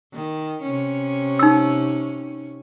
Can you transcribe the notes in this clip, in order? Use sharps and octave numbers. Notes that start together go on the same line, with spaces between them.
D#3
C3 C#4
D#4 E6